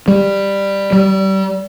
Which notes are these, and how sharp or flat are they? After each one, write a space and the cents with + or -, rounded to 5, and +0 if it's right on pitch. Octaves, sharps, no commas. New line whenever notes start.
G3 +10
G3 -30